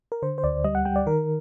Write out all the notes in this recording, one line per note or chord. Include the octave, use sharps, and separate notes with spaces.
A#4
D3 C5
C5
D2 D5
G3 D#5
F#5
G3 G5
D5
D#3 A#4